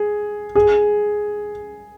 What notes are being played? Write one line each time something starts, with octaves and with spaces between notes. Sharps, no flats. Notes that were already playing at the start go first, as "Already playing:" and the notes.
Already playing: G#4
G#4